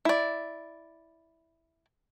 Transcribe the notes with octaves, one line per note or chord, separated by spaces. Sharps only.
E4 D5